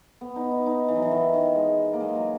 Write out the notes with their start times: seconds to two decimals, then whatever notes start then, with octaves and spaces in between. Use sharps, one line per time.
0.21 B3
0.36 D#4
0.51 D#4
0.66 D#4
0.88 E3
0.96 F#3
1.02 E3
1.11 D#3
1.34 D#3
1.56 G#3
1.93 A#3
2.00 G#3
2.15 F#3